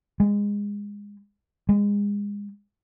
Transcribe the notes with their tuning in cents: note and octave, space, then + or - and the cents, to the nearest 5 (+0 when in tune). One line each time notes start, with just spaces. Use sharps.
G#3 -20
G#3 -30